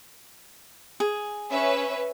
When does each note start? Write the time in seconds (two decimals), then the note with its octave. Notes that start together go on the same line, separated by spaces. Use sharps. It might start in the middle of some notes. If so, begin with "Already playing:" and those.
1.00 G#4
1.51 C#4 B4 E5